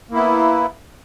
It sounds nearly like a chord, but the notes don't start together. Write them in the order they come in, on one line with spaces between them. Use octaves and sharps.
A#3 E4 B3